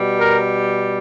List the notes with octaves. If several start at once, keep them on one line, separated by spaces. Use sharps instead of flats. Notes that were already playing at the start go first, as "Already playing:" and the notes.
Already playing: B2 G3
A#4